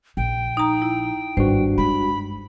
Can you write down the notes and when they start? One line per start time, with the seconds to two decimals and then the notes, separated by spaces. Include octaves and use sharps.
0.17 A#1 G5
0.57 D#4 A#5
0.82 E4
1.37 G#1 G2 F#4 C5
1.78 G#3 B5